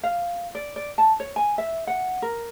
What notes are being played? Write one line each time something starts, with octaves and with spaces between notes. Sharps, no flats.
F5
D5
D5
A5
C#5
G#5
E5
F#5
A#4